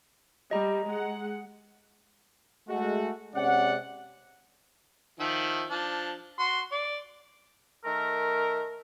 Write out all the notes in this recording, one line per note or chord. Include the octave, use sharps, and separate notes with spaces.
G3 D#5 A#5
G#3 F#5
G#3 A3 F#4
C3 G#3 C#4 D5 F#5
D#3 F3 E5
F3 D4
F#4 C6
D5
D#3 A3 A#4